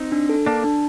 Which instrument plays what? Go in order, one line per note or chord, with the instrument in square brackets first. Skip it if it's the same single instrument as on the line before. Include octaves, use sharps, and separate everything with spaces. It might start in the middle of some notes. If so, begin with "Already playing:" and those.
Already playing: [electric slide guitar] C4 D#4
[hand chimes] D4
A4
[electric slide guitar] A#3 D4 [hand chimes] A5
[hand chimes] D4